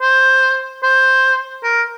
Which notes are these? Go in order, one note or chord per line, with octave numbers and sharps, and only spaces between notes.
C5
C5
A#4